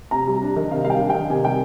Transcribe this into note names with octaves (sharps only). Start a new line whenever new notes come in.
C3 A#5
G3
D4
D#3
C3 F5
G3 F5
G5
D4
D#3 G5
C3 G#5
G3 G5